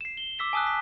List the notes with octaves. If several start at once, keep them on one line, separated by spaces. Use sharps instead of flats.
C7 E7
G7
D6 E6 B6 E7
G#5 A5 D#6 E6 F#6
B6